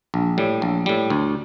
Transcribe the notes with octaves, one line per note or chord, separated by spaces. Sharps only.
A#1
A2 G3
A#1
A2 G3
D2